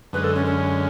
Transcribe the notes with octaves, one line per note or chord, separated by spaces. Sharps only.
F#2 D3 G#3 B4
A4
C#4
C#4